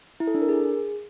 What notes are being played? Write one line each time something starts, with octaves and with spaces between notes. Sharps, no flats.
E4
A4
D4
A#4
G#4